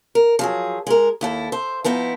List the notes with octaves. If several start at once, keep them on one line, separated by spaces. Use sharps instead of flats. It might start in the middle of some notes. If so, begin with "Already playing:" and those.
A#4
F3 F#3 G#4
G#3 A#4
D#2 E4 A4
C5 E5
F3 B3 D#4 E4